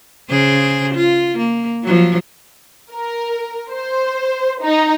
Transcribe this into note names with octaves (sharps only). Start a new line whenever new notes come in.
C#3 G#4 C5
F4
A#3
F3 F#3
A#4
C5
D#4